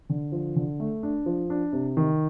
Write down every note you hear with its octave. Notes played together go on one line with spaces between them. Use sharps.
D3
F3
D3
A3
D4
F3
D4
C3
D#3